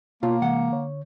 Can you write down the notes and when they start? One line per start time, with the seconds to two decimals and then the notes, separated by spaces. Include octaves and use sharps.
0.23 B2 A#3 F4 C#5 A5
0.42 C3 E3 G#3 F#5
0.72 D3 C#5